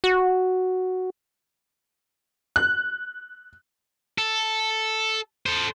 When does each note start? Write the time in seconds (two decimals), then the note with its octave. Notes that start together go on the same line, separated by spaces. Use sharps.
0.04 F#4
2.56 F#6
4.18 A4
5.46 A4 C5